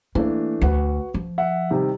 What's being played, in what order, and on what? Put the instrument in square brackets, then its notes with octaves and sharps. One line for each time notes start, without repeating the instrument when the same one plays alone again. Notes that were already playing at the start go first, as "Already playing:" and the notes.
[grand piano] E3 A3 D4 [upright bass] A#3
[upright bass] D2 [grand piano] F#4 B4 F#5
[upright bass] F3
[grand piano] E5 F#5
C3 D#3 G3